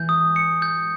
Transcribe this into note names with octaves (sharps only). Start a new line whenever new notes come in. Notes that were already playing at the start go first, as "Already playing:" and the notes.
Already playing: E3 G6
D#6
C#7
G6